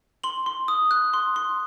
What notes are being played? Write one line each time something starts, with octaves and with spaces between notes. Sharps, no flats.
C6 F#7
C6
D#6
F#6
C6
C6